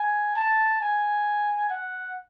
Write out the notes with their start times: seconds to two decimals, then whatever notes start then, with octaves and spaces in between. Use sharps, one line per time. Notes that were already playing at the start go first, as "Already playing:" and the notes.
Already playing: G#5
0.36 A5
0.81 G#5
1.70 F#5